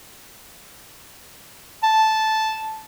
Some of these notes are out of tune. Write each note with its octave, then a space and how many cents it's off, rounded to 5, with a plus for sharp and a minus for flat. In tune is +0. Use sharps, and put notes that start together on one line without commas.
A5 -5